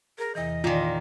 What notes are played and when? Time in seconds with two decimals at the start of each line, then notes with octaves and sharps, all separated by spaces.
0.18 G#4 A#4
0.35 E2 C3 E3 D#5
0.64 A#2 D#3 F4 D5 G#5 A#5